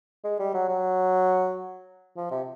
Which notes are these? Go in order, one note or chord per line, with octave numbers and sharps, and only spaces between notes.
G#3
G3
F#3
F#3
F3
C3